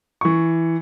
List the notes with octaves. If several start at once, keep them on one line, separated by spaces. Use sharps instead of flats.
E3 C#6